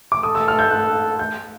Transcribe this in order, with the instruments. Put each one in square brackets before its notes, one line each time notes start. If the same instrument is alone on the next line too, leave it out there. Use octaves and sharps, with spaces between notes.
[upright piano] D6
[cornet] A4 [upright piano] D#6
[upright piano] E6
F6
G6
F#6
G6